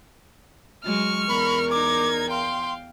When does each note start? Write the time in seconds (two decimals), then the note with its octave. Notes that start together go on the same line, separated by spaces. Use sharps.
0.84 F#3 G#3 C#6 F6
1.29 E2 A#4 B5
1.71 D#4 D6 G#6
2.30 F5 G5 C6